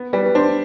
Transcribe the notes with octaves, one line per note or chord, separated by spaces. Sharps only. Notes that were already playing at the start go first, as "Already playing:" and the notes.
Already playing: B3
G3 B4 D5
B4
D4 C5